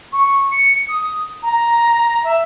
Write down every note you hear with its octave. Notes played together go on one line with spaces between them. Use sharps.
C#6
C#7
D#6
A#5
E5